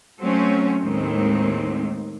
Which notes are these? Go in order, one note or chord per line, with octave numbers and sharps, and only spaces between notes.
F#3 A3 C4 C#4
D#2 A2 D#3 G#3 C4